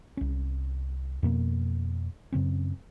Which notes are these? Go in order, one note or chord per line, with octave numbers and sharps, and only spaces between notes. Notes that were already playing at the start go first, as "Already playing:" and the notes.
C2 C#4
F2 B2 A#3
F#2 C#3 C4 C#4